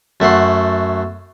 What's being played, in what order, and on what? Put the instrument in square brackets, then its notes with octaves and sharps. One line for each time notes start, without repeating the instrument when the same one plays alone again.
[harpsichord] F#2 A3 F#5 C6